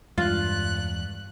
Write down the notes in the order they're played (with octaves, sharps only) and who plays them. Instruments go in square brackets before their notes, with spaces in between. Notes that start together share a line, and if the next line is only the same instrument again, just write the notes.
[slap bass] E2 G3 G#3 [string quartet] G2 F#6 [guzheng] F4